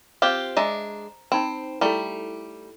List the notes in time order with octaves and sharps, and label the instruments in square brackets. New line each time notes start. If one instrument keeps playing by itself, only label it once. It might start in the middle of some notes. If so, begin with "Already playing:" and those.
[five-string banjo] C4 F4 G4 [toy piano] C5
[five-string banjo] G#3 D4 E5 [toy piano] A#5
[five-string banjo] C4 [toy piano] D#4 G5 B5
[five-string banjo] G3 A3 [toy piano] E4 A4